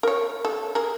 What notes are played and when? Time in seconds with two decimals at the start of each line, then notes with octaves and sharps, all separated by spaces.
0.03 A#4 C#5
0.45 A4
0.75 G#4 A#4